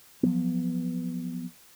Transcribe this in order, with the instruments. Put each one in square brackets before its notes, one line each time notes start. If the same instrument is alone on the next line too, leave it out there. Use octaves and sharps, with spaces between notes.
[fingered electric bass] F3 F#3 B3